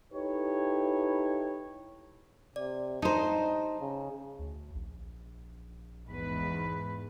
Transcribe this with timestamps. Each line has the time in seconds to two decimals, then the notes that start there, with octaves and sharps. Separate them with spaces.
0.13 D#4 E4 G4 A4 B4 C#5
2.56 C3 D5
3.02 G2 D#4 C5 A5 A#5
3.81 C#3
4.39 D2
4.75 A#1
6.08 E2 G#2 B4